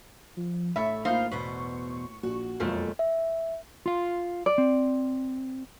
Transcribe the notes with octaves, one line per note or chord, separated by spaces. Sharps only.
F3
A1 A4 C#5 E5 B5
A#3 D#4 F4 C5 F5
E2 B2 B4 C5 C#6
A#1 F#4
E1 F2 F3 F#3 A3 A#3 F4
E5
F4 F5
D5
C4